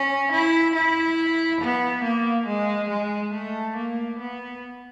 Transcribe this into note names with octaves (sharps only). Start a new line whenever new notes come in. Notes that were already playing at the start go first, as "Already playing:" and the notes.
Already playing: C#4
E4
E4
B3
A#3
G#3
G#3
A3
A#3
B3